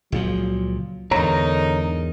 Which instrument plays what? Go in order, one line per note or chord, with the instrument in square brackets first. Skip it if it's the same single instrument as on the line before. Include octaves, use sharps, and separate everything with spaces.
[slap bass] C#2 A#2 F3 [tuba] F#3
[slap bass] E2 G#2 [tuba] D3 [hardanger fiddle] D#4 A#4 [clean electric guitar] C#5 A#5